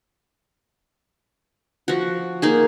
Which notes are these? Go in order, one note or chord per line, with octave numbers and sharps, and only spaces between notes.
F3 F#4
A#3 D#4 G#4